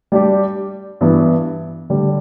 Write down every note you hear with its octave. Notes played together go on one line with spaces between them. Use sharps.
G3 D4 G4
G2 E3 B3 E4
D3 G3 D4